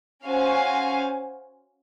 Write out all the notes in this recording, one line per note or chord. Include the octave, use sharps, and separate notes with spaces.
C#4 F#4 C5 F5 G#5